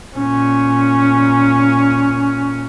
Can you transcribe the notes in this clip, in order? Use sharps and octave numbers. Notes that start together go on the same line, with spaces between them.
A#2 C#4